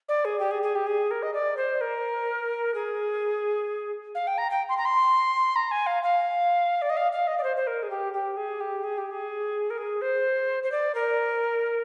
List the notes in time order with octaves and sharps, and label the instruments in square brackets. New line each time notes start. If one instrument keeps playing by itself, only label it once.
[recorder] D5
G#4
G4
G#4
G#4
G4
G#4
A#4
D#5
D5
C5
A#4
G#4
F5
G5
A#5
G5
C6
A#5
C6
A#5
G#5
F5
F5
D5
D#5
F5
F5
D#5
D5
C5
C5
A#4
G#4
G4
G4
G#4
G4
G#4
G4
G#4
A#4
G#4
C5
C5
D5
A#4